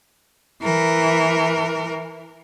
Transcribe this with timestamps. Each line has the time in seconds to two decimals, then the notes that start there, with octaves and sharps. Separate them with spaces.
0.63 E3 A#4